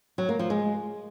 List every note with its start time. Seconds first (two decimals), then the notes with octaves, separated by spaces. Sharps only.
0.18 F#3
0.29 A#3
0.39 F3
0.50 G#3